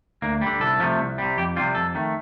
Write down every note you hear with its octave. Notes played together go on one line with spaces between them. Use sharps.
D2 A#3
D3 G3
C2 A4
C3 F3 A3
C2
C3 G3
F2 G4
C3 G3 F4
F2 A4
D#3 A3